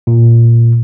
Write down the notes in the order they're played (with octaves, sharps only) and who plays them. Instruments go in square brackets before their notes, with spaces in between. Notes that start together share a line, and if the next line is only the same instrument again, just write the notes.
[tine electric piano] A#2